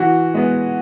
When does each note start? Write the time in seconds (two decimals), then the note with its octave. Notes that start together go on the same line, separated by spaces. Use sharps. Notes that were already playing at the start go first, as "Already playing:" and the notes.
Already playing: E3 F#4
0.34 G#3 B3